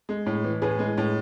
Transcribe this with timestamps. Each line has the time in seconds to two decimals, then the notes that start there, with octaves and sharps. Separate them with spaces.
0.09 G#3
0.26 A2
0.44 E3
0.62 A2 G#4 B4
0.79 G#3
0.98 A2